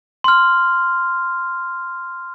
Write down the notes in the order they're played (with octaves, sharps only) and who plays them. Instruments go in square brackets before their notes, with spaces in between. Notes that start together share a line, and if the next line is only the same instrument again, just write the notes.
[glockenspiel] C6 F6